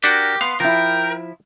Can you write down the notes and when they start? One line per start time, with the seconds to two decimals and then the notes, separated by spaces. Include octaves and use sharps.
0.04 D4 F#4 G4 A#4
0.41 B3 F5 C6
0.60 F3 E4 A#4 G5